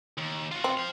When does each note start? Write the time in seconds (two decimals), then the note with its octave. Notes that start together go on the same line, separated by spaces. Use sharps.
0.18 D#2
0.52 F4 F#4
0.64 C4
0.77 C5 F5